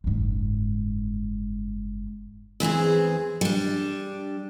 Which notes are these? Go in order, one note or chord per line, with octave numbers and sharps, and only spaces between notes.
F#1 G#2
E2 E3 C4 G#4
G3 D4